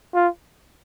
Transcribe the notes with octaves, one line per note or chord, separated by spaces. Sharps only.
F4